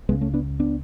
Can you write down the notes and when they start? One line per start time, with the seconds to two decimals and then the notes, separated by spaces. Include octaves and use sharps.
0.09 C#2 G#3 B3
0.12 C#3
0.21 A3 C#4
0.34 B3 D4
0.60 B3 D4